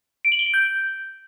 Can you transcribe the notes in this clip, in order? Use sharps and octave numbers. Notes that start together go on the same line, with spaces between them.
D7
F#7
G7
D7
G6